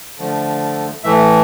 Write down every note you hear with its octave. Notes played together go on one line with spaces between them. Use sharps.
D3 F3 A3
A2 E3 A3 E5